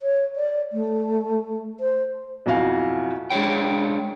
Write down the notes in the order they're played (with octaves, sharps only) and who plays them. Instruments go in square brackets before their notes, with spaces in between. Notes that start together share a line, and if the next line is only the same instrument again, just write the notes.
[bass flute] C#5
D5
A3
C5
[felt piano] B1 F2 E4 F#4 F5 G#5
[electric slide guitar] G#3 D4 D#4 C#5 G5